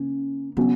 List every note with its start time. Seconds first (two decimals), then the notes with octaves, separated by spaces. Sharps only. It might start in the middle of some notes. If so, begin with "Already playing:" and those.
Already playing: C#3 A#3 C#4
0.57 C#3 F#3 B3 C#4